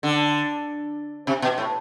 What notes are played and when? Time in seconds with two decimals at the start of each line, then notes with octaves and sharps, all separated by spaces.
0.03 D3
1.27 C3
1.42 B2
1.58 A2